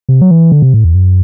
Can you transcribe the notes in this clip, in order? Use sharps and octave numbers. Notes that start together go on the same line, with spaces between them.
C3
F#3
E3
D3
C3
A2
E2
F#2